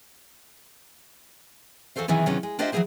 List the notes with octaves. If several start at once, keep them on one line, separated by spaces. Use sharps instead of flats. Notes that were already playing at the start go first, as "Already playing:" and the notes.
E2 F#4 A4 C5 F5
C3 D#3 E3 F#3 B3 G#4
C3 D#3 F#3 G#3 B3 C#4
G#3
D4 F4 G4 C5 D#5 E5
E3 F#3 G3 A#3 G#4 C5